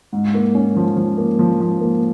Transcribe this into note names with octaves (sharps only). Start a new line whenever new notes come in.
G#2
A#3
C#4
F3
F3
A#3
F3
F3
A#3